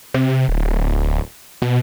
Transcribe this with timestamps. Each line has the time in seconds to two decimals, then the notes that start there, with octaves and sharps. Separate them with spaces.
0.14 C3
0.48 D1
1.62 B2